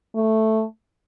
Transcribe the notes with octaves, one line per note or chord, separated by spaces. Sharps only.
A3